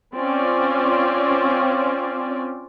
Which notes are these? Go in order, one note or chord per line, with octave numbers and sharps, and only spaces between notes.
C4 C#4 F4 D5